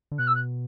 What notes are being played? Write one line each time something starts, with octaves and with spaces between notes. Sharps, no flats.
D3
B2 F#6
E6
F#6